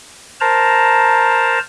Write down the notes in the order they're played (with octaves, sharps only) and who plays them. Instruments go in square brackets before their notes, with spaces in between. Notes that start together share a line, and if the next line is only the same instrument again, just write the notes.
[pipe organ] A#4 C5 A5 A#5